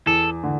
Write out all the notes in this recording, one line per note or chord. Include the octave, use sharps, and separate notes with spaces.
E2 A4
D3